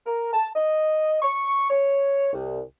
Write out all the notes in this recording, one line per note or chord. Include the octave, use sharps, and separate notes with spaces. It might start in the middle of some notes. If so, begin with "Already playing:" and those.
A#4
A5
D#5
C#6
C#5
C2